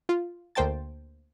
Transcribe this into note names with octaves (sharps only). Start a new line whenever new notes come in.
F4
D2 A#3 C5 G5 A5 A6